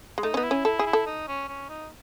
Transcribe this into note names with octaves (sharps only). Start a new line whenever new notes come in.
G#3
A3 D#4
B3 C#4 D#4
E4
C#4
E4 A4
G#4
E4
A4
D#4
C#4
C#4
D#4